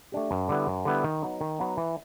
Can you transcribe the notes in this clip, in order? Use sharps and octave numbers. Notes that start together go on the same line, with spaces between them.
A3 D4 G4
F#2
D3 G3 B3 E4
F#2
D3 G3 B3 E4
D#3
F#3 B3 D#4
D#3
F#3 B3 D#4
E3